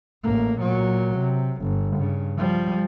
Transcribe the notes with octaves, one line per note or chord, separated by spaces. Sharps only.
A1 A#3
A#2 F#3
C3
G1
G2 C#3
F3 G3